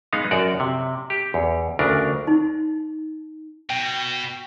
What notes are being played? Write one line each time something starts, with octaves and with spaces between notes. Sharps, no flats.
G#3 B3 D#4 F5
F#2 F#4 A#4 D5
C3
G4
E2
D2 C#3 D4 A#4
D#4
B2 G5